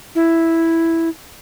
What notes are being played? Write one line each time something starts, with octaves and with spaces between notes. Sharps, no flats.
E4